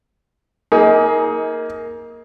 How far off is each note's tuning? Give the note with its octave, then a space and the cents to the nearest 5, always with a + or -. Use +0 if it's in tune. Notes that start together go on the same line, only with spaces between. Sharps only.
A#3 +0 D#4 +30 G#4 +15